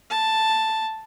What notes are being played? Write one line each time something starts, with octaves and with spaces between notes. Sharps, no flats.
A5